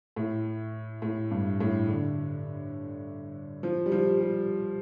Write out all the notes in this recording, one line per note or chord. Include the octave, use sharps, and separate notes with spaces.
A2
A2
G2
A2
D3
F3
G3
F3
G3